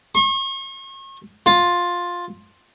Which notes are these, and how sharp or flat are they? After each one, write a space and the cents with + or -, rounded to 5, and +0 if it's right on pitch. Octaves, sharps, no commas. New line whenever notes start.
C#6 -40
F4 +10